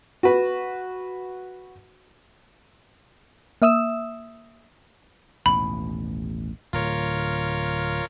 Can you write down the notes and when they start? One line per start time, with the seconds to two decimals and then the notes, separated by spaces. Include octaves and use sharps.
0.23 F#4 B4
3.62 A#3 E5 D#6 E6 E7
5.46 A1 D#2 B2 B5
6.73 D1 F4 A#4 C#5